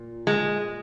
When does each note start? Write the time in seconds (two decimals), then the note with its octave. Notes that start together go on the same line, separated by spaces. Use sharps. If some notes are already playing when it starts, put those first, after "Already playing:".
Already playing: A#2
0.27 G#3